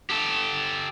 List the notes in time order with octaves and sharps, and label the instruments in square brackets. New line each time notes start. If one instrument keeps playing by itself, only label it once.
[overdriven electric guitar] G4 A4